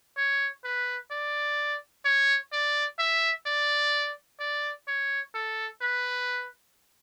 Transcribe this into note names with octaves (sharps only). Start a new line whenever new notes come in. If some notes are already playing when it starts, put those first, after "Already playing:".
C#5
B4
D5
C#5
D5
E5
D5
D5
C#5
A4
B4